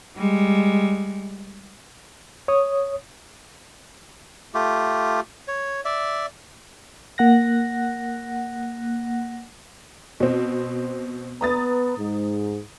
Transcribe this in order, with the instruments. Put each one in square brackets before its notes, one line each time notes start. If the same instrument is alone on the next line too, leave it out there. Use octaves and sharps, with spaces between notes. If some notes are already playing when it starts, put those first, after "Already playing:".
[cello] G3 G#3
[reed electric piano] C#5 D#6
[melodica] A3 F4 G4
C#5
D5 E5
[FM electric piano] A#3 F#5 F#6 A#6
[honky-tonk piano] B2 C4
[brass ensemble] B3 B4 [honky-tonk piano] A#5 D#6 A6
[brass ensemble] G#2